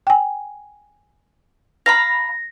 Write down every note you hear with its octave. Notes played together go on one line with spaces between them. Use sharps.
G5 G#5
F5 A#5 B5 A#6